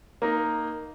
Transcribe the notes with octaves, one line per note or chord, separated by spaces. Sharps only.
A#3 D#4